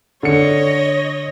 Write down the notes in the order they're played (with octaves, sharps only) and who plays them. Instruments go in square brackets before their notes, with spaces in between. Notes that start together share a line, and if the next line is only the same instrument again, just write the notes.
[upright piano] D3 C#7 [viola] C#5 D#5